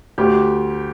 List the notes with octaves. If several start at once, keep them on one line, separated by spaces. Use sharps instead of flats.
D2 G4